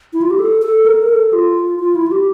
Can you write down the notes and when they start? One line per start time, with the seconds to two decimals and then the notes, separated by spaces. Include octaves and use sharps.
0.13 E4
0.22 F4
0.30 G4
0.39 A4
0.62 A4
0.86 A#4
1.09 A4
1.33 F4
1.80 F4
1.95 E4
2.06 F4
2.11 G4